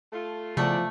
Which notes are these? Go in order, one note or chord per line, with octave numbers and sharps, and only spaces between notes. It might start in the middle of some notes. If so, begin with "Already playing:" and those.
A3 F4
E2 C#3 F3 A3 D5